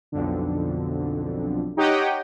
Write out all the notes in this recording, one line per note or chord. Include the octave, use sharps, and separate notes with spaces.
B1 F2 D3
D#4 G4 C#5 D#5 F#5 G5